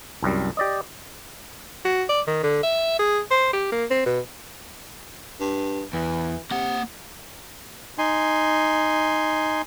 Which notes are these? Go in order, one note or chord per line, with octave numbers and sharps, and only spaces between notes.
C2 F#2 G3
G4 D5 D#5
F#4
D5
D#3
D3
E5
G#4
C5
G4
A#3
C4
B2
G2
E2 E3
C3 A#3 F#5
D#4 G#5 C6